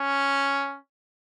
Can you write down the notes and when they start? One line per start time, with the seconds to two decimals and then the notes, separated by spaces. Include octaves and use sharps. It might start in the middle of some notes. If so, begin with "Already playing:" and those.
Already playing: C#4